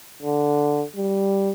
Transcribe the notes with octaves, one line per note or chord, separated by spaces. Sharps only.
D3
G3